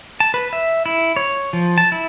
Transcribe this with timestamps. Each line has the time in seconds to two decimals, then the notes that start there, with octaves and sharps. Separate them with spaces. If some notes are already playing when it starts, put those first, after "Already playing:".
0.20 A5
0.34 B4
0.53 E5
0.86 E4
1.17 C#5
1.53 F3
1.78 A5
1.92 E4